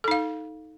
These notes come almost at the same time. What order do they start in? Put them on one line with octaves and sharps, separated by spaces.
A4 D#4 F5